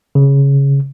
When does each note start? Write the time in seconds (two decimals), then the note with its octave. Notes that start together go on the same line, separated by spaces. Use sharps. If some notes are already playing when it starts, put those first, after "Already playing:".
0.15 C#3